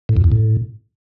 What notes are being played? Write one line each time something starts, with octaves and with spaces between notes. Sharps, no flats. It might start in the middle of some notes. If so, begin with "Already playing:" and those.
A2
F2
E2
A2